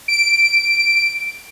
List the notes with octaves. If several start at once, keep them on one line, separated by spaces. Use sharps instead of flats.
D7